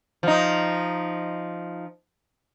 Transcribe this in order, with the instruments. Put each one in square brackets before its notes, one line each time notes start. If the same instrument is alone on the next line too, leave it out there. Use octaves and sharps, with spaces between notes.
[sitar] F3 D#4